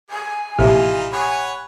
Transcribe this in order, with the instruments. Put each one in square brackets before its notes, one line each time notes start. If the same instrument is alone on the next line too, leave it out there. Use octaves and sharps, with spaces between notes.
[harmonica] G#4 [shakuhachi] G#5
[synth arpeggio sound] A#1 A2 C3 [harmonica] E3 D#4 F4 [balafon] G4 E5
[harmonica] C#5 F#5 B5 [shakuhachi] G#5